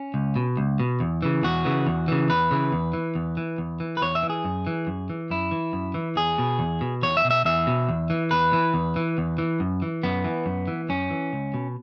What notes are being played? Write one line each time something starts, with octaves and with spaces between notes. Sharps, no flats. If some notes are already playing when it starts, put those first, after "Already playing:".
Already playing: C#4
C#2
B2
C#2
B2
E2
C#3 E3
E2 F#4
C#3 E3
E2
C#3 E3
E2 B4
C#3 E3
E2
E3
E2
E3
E2
E3
B4
E2 C#5
E5
E3
G#4
F#2
E3
F#2
E3
F#2 E4
E3
F#2
E3
E2 G#4
B2
E2
B2
E2 C#5
E5
B2
E5
E2 E5
B2
E2
E3
E2 B4
E3
E2
E3
E2
E3
F#2
E3
F#2 B3
E3
F#2
E3
F#2 C#4
E3
C#2
B2